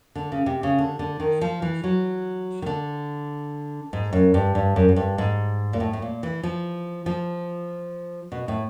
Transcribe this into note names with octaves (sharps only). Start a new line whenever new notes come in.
D3
C#3
C3
C#3
D3
D3
D#3
F3
E3
F#3
D#3
D3
G#2
F#2
G2
G2
F#2
F#2
G2
G#2
A#2
A2
A2
A#2
E3
F3
F3
B2
A2